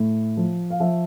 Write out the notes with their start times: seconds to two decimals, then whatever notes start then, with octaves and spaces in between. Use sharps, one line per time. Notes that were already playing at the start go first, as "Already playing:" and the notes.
Already playing: A2
0.37 F3
0.70 F5
0.80 F3 E5